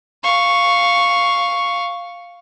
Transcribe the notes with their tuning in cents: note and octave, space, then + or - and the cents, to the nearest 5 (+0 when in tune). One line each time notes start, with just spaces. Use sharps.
F5 +0 C#6 +0